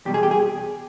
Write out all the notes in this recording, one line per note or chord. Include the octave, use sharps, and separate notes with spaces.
E2 B2 G3 G4
G#4
G4
G#4